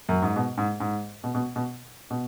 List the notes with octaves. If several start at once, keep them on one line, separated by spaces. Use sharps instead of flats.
F#2
G#2
B2
G#2
G#2
B2
B2
B2
B2